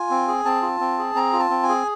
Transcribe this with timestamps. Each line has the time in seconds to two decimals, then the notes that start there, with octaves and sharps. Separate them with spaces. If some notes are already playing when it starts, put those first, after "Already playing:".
Already playing: F4 G#5
0.10 C4
0.28 G#4
0.45 C4 A5
0.62 F4
0.80 C4
0.98 G#4
1.15 C4 A#5
1.33 F4
1.39 A5
1.50 C4
1.63 G#5
1.69 G#4